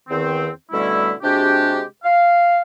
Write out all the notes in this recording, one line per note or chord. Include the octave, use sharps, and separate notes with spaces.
E2 D#3 C4
B2 D3 G3 A3 C#4 E4
C3 G#3 D4 F#4 G4
F5